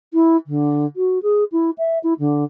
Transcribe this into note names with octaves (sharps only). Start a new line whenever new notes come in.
E4
D3
F#4
G#4
E4
E5
E4
D3